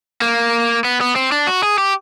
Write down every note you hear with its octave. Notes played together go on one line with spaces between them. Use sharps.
A#3
B3
B3
C4
D4
F#4
G#4
G4